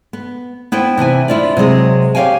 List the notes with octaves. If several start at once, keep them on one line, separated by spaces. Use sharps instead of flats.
B3
B3 E4 C5 G5
C3 E3 E4 G#5
E4 F4 D5
C3 F#3 G#3 G#4
G4 C#5 D5 F5 G5 G#5